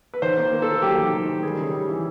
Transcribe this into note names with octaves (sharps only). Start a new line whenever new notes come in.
B4
D#3 C5
A#3
A#3
A4
A#3
F#3 G4
D#3
D#3
D#3
G3 G#4
C#3
G3
E3